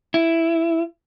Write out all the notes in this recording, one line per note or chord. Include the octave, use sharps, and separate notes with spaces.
E4